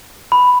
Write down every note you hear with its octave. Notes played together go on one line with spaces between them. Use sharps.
B5